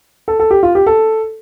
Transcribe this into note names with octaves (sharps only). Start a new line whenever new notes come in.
A4
A4
G4
F4
G4
A4